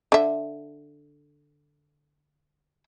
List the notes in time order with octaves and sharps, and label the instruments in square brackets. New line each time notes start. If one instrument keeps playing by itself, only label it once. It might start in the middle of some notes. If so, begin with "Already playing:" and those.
[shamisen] D3 E5